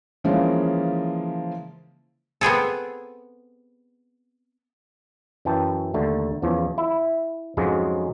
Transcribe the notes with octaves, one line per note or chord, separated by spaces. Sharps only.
C#3 E3 F3 G#3 A#3 C#4
B3 C4 G#4 A4
F#2 E3 G5 A5
D#2 D3 A3
E2 C#3 E3 F3
E4
F2 G#2 C#3 F#3 G#3